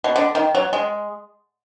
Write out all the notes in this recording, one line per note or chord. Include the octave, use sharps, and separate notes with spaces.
B2
D3
D#3
F#3
G#3